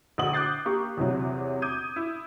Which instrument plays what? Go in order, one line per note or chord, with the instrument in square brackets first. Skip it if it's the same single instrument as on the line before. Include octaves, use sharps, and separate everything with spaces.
[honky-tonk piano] A#1 D3 F#4 D#6 F#7
D6 F#6 G6 A6 C7
A#3 G4 C#6
E2 C3 F#3
D6 D#6 G6 G#6 D#7
E4